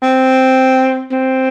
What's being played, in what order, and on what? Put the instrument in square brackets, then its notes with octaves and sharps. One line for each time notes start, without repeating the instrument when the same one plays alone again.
[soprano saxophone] C4
C4